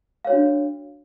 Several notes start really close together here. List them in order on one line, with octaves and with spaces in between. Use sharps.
F5 C#5 F#4 D4